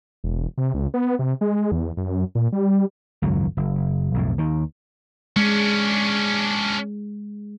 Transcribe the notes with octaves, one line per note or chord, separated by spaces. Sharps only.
E1
C3
C#2
B3
C3
G#3
E2
F#2
A#2
G3
G#1 C#2 F#2 F#3
F#1
B1 F2 A2
D#2 D#3
G#3 C#4 D4